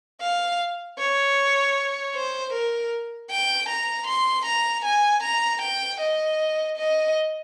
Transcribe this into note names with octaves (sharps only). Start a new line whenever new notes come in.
F5
C#5
C5
A#4
G5
A#5
C6
A#5
G#5
A#5
G5
D#5
D#5